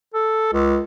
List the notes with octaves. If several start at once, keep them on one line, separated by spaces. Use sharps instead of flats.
A4
C#2